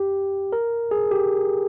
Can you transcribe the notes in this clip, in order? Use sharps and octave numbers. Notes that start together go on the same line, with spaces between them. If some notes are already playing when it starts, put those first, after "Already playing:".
Already playing: G4
A#4
G#4
G4